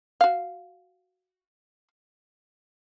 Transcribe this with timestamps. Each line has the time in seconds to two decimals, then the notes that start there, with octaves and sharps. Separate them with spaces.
0.21 F#4 F5